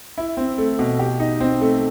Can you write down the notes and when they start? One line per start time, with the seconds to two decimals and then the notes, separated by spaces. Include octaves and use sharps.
0.18 E4
0.37 C4
0.58 A3
0.79 B2
0.99 G4
1.19 D#4
1.40 C4
1.61 A3